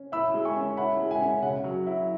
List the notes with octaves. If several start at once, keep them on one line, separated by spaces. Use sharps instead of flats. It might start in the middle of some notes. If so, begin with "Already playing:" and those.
Already playing: C#4
E4 B5 E6
G#3
G#5 C#6
C#4
E4 F#5 B5
G#3
E5 G#5
C#4
C#3 F#5
F#3
E4